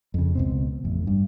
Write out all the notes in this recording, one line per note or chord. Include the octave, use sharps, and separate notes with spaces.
F2 C#3
C#2 B2 C4
A1 F2
G2